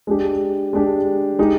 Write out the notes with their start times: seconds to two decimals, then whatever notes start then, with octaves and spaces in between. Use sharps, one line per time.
0.07 G#3 D4 G4
0.73 G#3 D4 G4
1.39 G#3 D#4 G4